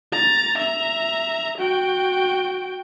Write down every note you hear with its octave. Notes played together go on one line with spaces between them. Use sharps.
A#5 A6
E5 A#5
F#4 G5